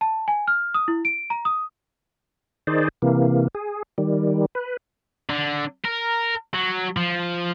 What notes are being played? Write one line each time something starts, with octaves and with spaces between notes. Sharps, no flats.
A5
G#5
F6
D#6
E4
D7
A#5
D#6
D#3 D#4 G#4 C5 D5
C3 E3 A#3
G#4
D#3 G3
B4
D3
A#4
F#3
F3